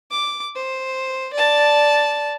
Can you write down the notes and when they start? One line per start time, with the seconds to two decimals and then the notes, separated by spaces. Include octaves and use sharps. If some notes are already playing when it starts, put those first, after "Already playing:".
0.11 D6
0.55 C5
1.33 D5 A5